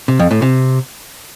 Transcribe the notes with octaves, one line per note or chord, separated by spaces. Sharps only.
C3
F2
A2
C3